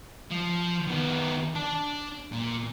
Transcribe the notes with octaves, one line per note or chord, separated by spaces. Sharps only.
F3
D#3 B3
D4 A5
A#2